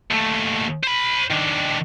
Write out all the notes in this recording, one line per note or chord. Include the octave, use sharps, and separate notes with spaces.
D#2 A3
C5 B5
D#3 D4